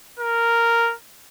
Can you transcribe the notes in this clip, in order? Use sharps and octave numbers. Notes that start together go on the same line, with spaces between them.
A#4